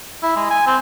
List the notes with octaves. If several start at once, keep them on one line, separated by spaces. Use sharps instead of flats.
E4
G#3
G#5
C4